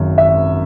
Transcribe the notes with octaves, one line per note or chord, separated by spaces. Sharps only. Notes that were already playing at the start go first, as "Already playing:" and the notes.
Already playing: G#1 F#2
E5